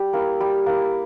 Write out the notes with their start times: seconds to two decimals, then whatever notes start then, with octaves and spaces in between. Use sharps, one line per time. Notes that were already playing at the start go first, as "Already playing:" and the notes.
Already playing: G3 G4
0.13 A#3 E4
0.40 G3
0.66 A#3 E4